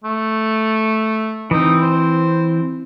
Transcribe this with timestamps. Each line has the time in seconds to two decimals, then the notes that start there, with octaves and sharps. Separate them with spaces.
0.04 A3
1.51 E3 C4 D#4
1.82 C5